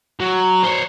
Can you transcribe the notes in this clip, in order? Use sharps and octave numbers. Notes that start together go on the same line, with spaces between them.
F#3
C5 C#5